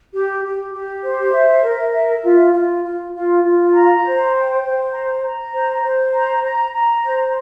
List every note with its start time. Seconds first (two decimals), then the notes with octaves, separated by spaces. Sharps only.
0.13 G4
0.43 G4
0.73 G4
1.03 C5
1.33 E5
1.63 A#4
1.93 E5
2.23 F4
2.53 F4
2.83 F4
3.14 F4
3.43 F4
3.73 A#5
4.04 C5
4.33 G5
4.63 C5
4.93 A#5
5.23 A#5
5.53 C5
5.84 C5
6.13 A#5
6.44 A#5
6.74 A#5
7.03 C5